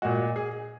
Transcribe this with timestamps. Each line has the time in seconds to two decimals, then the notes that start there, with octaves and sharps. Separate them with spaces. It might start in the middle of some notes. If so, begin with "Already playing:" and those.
0.02 A#2 G#3 F#4
0.36 G#4